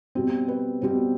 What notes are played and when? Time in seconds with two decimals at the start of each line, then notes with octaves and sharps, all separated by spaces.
0.15 B2 G3 C4
0.48 B4
0.81 B2 G3 C4 C5